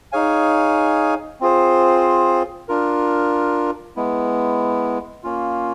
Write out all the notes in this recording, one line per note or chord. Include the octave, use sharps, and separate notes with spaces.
D#4 G#4 C#5 F5 G#5
C4 F4 G#4 C5
D4 F4 A#4
G#3 B3 E4
A#3 C#4 F4